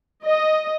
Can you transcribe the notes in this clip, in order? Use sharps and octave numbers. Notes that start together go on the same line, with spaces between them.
D#5